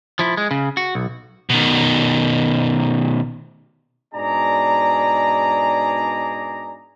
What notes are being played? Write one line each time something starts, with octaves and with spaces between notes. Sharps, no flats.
F3 E4
G#3
C#3
F#4
B1
B2 D#3
G#2 B2 D4 G#4 D5 A#5